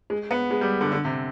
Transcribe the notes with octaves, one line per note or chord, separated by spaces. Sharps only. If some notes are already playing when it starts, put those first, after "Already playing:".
G#3
B3
G#3
G3
D3
D3
C3